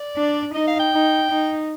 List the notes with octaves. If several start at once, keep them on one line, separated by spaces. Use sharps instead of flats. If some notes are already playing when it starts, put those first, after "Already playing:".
Already playing: D5
D4
D#4 D#5
F5
G5
D#4
D#4